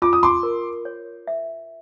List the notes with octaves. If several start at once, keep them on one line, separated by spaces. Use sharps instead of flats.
F4 D6
D#6
C6 D6
A#4
C#5
E5